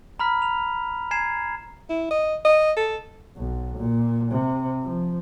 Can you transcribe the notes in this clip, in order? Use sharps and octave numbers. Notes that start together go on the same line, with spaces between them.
A#5 B5 F6 B6
F7
G#5 A#5 G#6 C7 E7
E4
D#5
D#5
A4
B1
A#2
C3
F3